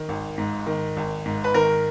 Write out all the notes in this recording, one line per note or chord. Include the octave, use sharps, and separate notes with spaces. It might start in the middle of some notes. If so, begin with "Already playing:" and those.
Already playing: D#3
G#1
G#2
D#3
G#1
G#2
B4
D#3 A#4